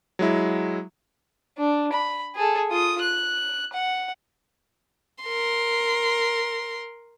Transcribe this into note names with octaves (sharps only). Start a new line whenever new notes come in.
F#3 G#3 E4
D4
B5
G#4 A4
F4 D#6
F#6
F#5
A#4 C6